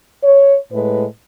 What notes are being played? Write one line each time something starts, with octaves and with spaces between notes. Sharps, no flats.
C#5
A2 G#3 B4